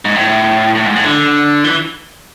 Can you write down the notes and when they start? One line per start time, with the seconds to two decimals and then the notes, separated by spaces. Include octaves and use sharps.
0.05 G#2
0.15 A2
0.75 A2
0.86 G#2
0.96 A2
1.04 D3
1.64 E3